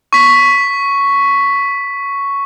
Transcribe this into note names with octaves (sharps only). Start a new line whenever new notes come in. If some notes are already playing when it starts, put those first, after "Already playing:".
C#6 B6